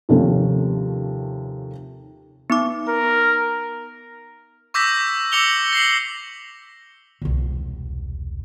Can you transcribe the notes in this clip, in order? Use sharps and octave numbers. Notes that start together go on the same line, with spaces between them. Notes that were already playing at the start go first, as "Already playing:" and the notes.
D#2 C3 F3 A3 C#4
B3 D#4 D6
A#4
C#6 D6 E6 G6 A#6 B6
D6 E6 A#6 C#7 F7 G7
A#6 C7 F#7
E1 C2